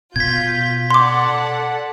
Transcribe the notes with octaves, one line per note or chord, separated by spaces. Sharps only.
B2 F4 G6 G#6 B6
A4 D5 F#5 C6 D6